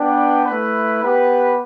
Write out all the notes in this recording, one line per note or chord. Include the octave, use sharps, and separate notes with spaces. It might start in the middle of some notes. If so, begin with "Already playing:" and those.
Already playing: B3 D4 B4 D5 G5
A3 E4 B4
B3 G4 B4